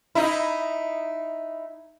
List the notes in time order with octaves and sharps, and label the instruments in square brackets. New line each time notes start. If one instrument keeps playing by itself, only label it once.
[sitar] D#4 E4